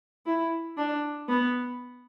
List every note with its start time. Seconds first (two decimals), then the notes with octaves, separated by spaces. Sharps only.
0.26 E4
0.77 D4
1.29 B3